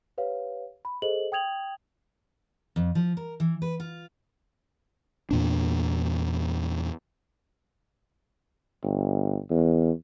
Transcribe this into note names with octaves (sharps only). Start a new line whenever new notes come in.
G4 B4 C#5 F5
B5
G#4 A4 C5 D#5 F#7
G5 D#6 G#6 F7 F#7
F2
F3
A#4
E3
B4
F4
E2 A#2 D4
G1
E2